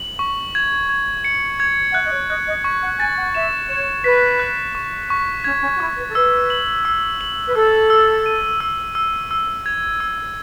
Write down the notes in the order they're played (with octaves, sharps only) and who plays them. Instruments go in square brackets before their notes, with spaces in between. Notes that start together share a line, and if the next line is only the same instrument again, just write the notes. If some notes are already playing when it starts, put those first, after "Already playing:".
Already playing: [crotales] F#7
C#6
G#6
G#6
C#7
G#6
[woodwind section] F#5
[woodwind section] E5 [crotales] F#6
[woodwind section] D#5
C#5
[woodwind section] D#5 [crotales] F#6
[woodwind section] D#5
[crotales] C#6
[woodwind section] F#5
[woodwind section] G#5 [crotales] A6
[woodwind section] F#5
[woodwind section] E5 [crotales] E7
[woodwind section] C#5 [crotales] E7
[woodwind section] B4 [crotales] B6
[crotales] F#6
C#6
C#6
[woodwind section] C#4 [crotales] G#6
[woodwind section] C#4
F#4
[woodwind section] E4 [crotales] C#6
[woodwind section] B4
A4
[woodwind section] B4 [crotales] E6
[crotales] F#7
E6
F#7
[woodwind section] B4
[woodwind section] A4 [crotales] E6
[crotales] E6
D#7
E6
E6
E6
G#6
E6